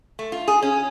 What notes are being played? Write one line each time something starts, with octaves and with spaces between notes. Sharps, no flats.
A3
F4
G#4
C#4